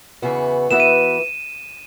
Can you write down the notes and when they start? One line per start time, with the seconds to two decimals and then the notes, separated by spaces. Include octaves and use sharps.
0.22 E2 C#3 E3 B3 F#4
0.71 E3 B3 F#4 B4 E5 E7
0.80 D#7